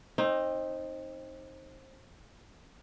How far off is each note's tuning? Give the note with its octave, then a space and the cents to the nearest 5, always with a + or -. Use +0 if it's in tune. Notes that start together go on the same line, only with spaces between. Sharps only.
C4 +25 D#4 +0